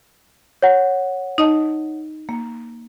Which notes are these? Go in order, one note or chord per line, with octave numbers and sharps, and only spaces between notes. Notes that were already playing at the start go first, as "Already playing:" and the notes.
C#5 F#5
D#4 D#5 A5
A#3